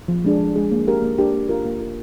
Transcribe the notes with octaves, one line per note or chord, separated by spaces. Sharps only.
F3
G#3 D4 G#4
F3
G#3 D4 G#4
A#3
D4 G4 A#4
A#3
D4 G4 A#4
A#3
F4 A#4
A#3
F4 A#4